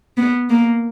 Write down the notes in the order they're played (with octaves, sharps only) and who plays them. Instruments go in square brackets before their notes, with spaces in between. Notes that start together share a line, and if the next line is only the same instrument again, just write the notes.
[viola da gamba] B3
A#3